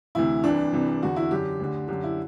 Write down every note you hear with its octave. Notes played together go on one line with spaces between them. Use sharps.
D2 C3 E3 E4
C2 C3 E3 D4
C2 C3 E3
E2 D3 F#4
E4
F#2 D3 G4
D2 D3
F#2 D3 G4
E4